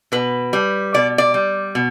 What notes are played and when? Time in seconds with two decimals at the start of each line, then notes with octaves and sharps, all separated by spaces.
0.12 B2 B4
0.53 G3
0.94 B2 D5
1.18 D5
1.34 G3
1.75 B2